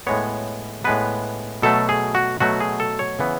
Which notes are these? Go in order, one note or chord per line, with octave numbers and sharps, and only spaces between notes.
A2 G#3 B3 C#5
A2 G#3 B3 B4
B2 F#3 A3 A4
G#4
F#4
B2 F#3 A3 F#4
G#4
A4
C#5
C#3 E3 B3